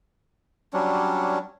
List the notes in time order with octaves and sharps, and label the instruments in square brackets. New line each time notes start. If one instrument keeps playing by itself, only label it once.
[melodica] F#3 G3 C#4 D4